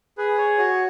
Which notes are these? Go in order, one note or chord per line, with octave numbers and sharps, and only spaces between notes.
G#4 B4
C#5
F#4 C#5